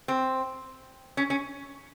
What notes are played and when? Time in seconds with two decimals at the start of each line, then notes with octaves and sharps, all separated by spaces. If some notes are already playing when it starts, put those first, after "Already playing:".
0.08 C4
1.17 C#4
1.30 C#4